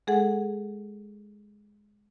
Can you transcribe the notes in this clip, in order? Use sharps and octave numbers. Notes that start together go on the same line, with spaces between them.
G#3 G#4 A4 F#5